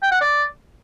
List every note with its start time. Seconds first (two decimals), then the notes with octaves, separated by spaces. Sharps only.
0.02 G5
0.12 F#5
0.21 D5